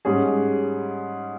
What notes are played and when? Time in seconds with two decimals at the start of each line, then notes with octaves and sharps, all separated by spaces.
0.05 G#2 G3 C#4 G#4